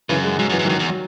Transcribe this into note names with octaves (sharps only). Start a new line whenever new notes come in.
F#2 C#3 E3
G#3
G#2 F#3
F#2 E3
G#2
F#2 D#3 F#3
E2
F#3